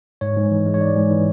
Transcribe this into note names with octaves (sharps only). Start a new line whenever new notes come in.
G#2 C#5
G#2
E3
G#3
C#5
G#2 D5
G#2
E3